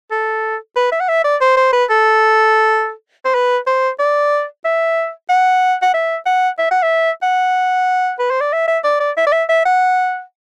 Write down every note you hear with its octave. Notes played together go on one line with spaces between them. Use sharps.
A4
B4
E5
F#5
E5
D5
C5
C5
B4
A4
C5
B4
C5
D5
E5
F#5
F#5
E5
F#5
E5
F#5
E5
F#5
B4
C5
D5
E5
E5
D5
D5
E5
D5
E5
E5
F#5